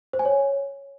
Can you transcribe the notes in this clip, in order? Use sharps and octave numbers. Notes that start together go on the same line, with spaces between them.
C5
G#5
C#5